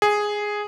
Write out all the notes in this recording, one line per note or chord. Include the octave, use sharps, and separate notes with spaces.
G#4